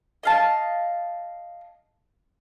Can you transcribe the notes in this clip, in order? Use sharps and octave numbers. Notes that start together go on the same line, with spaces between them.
D#5 F5 A5